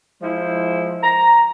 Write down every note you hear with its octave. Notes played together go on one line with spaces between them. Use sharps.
F3 G#3 E4 C5
A#5